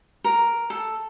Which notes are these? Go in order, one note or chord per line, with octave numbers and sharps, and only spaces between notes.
A#4
A4